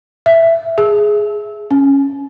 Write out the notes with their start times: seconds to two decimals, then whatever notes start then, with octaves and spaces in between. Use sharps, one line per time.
0.26 E5
0.78 G#4
1.71 C#4